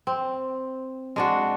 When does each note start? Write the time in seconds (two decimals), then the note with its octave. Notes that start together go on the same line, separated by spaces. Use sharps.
0.07 C4
1.16 G#3 D4 F#4